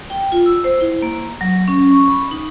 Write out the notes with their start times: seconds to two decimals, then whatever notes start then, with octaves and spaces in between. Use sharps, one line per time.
0.10 G5
0.32 F4
0.46 E6
0.64 C5
0.81 E4
1.02 A#3
1.41 F#3
1.68 C#4
1.92 C#6
2.08 B5
2.31 D#4